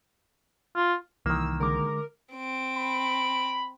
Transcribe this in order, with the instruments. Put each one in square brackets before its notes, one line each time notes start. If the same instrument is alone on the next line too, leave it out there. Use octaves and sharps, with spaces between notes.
[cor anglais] F4
[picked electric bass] C2 E3 [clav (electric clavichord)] D#3 A#3 [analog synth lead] E6
[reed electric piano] D3 G#3 D6 [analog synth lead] A#4
[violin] C4 D7
[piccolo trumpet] B5